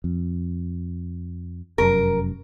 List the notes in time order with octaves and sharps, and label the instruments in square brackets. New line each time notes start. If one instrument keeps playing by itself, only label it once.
[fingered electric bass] F2
[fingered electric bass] F1 F#2 [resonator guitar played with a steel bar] A#4